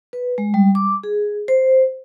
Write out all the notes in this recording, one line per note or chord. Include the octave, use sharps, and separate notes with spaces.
B4
G#3
G3
D6
G#4
C5